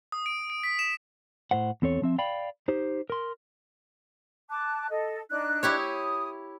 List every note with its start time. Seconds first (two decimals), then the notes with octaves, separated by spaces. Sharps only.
0.12 D#6
0.26 D7
0.50 D7
0.63 B6
0.79 E7
1.51 A2 C5 F#5
1.82 E2 C4 A4 C#5
2.02 F3 C4 E5
2.18 D5 F5 G5 B5
2.68 D#4 G4 C5
3.10 A#4 C6
4.50 A5 D6 F#6
4.90 A4 D#5
5.30 D4 D#4 F#6
5.63 E4 G4 C#5
5.78 D#6